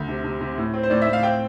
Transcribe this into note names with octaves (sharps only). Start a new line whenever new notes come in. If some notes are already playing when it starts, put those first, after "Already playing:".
Already playing: D2
C3
C3
C3
A2
C4
C5
A2 D5
E5
A2
F5
C4 G5